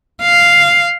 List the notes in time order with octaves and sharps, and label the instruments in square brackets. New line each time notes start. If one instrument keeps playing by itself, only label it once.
[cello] F5